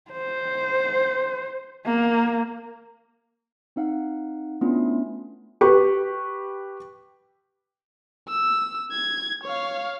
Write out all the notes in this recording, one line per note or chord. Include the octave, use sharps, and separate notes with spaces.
C5
A#3
C4 D#4 F5 F#5
A3 B3 C#4 D4 E4 F4
G4 B4 C#6
E6
G#6
C#5 F5